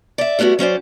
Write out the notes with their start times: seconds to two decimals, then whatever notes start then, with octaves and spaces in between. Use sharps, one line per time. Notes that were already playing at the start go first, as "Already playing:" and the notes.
0.18 D5 E5
0.39 G3 A3 B3 E4 F#4
0.59 F#3 C#4 C5 D5